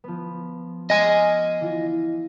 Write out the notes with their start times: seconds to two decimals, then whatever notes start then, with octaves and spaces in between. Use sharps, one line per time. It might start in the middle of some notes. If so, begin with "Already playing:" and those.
0.04 F3 B3
0.90 D#5 G#5 D6 F6 A6
1.61 E3 F4